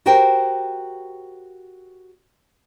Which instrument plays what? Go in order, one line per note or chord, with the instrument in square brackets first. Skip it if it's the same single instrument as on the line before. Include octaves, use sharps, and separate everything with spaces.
[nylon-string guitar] F#4 G4 A#4 C5 G5